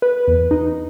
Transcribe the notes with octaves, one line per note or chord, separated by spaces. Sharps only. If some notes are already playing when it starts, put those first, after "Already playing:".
B4
E2
D#4